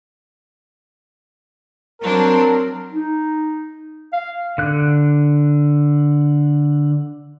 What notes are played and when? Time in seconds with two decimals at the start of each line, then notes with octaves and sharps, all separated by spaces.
2.01 F#3 C4 D4 A#4
2.91 D#4
4.13 F5
4.58 D3 F#6